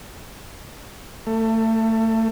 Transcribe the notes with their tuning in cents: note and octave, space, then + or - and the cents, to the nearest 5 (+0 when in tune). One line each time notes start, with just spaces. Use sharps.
A3 +25